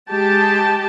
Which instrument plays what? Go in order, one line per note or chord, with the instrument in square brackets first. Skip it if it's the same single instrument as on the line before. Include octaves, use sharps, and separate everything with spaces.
[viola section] G#3 G4 A5